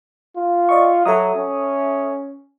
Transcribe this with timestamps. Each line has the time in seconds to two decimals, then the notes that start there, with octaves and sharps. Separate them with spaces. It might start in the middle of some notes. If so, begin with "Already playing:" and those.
0.35 F4
0.69 D5 D#5 C#6
1.06 F#3 A4 E5 D#6
1.35 C#4